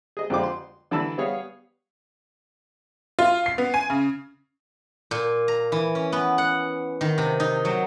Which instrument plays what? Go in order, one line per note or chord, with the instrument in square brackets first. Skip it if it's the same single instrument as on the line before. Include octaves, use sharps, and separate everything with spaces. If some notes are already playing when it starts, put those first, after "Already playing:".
[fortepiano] G#4 D#5
F2 D3 G#3 F4 C5 D6
C6
D3 E3 D4 A5 B5 E6
G3 B3 G#4 C#5 F5
[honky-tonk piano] F4
C7
B3
G#5
C#3
[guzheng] A#2
A#5
E3
C#4
B3
F#5
D#3
C3
D#4
F#3